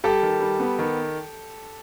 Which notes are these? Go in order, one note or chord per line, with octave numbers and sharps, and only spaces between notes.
G3 G4 A4
D#3
G3
B3
D#3